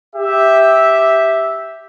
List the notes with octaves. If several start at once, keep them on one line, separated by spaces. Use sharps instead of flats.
G4 E5